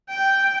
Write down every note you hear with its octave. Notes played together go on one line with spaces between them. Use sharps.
G5